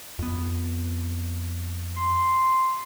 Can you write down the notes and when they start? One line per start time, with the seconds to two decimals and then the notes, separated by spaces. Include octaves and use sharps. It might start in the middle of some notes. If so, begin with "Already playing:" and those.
0.19 F2 B3
1.97 C6